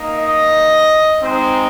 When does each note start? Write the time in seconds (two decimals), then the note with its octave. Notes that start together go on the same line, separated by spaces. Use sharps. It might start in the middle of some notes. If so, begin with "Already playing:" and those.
Already playing: A#3 D#4
0.17 D#5
1.22 G#3 C4 D#4 C5